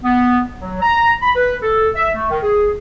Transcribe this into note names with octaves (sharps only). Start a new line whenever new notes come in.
B3
F#3
A#5
B5
B4
A4
E5
A3
D#3
G#4